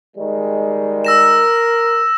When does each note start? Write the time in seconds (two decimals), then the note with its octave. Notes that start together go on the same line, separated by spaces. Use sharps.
0.16 D#3 G3 G#3
1.05 A#4 E6 A#6 E7